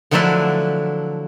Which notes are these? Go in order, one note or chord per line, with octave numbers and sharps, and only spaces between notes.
D3 F3 F#3 A3 D4 E4